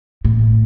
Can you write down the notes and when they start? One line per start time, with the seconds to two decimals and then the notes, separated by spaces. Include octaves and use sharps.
0.25 A2